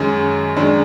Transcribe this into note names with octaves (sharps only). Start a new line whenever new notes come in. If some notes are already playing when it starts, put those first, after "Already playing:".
Already playing: F#2 D#3 G#3 C#4
F#2 D#3 G#3 D4